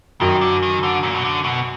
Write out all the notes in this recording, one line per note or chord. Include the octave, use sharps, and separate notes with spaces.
F#2 D#3
D3
D#3
D3
A#2
B2
D3
B2